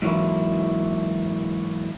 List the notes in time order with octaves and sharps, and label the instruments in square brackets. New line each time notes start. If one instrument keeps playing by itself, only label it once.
[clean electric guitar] G#2 E3 F#3 A#3 E4